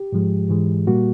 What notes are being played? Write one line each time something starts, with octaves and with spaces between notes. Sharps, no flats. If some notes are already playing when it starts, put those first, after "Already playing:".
Already playing: G4
G#2 F3 G#3
G#2 E3 G#3
A#2 G3 A#3 F#4